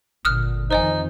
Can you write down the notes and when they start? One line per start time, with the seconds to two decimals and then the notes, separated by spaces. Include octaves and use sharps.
0.25 G1 A#2 D3 D#6 F6 F#6
0.71 F2 D#3 D#4 C5 D#5 G#5